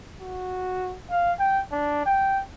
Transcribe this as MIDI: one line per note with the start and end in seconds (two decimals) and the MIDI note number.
0.21 0.96 66
1.10 1.32 77
1.39 1.59 79
1.72 2.03 62
2.06 2.40 79